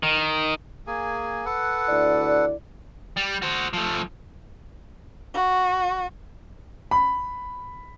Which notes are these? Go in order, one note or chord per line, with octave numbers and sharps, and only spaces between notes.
D#3
A#3 G#4 G#5
A4 B4 F#5
D2 E4 D5
G3
F#4 C5
F3 A3
F#4
B5